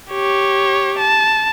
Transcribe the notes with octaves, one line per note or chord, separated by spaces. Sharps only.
G4 C#5
A5